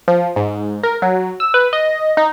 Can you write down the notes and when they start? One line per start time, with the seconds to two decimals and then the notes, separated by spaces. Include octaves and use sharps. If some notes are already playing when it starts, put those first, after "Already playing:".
0.08 F3
0.36 G#2
0.83 A#4
1.02 F#3
1.40 E6
1.54 B4
1.73 D#5
2.17 D#4